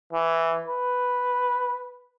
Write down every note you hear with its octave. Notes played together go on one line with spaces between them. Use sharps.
E3
B4